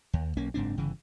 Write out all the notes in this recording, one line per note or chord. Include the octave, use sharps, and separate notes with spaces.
D#2
B1 A#3 C#4
F#1 G#2 C4 D4
G1 C#3 E3